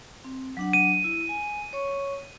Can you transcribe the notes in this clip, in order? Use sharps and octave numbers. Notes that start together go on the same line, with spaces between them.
C4
F#3 D4 F#5
D#7
E4
G#5
C#5 C#6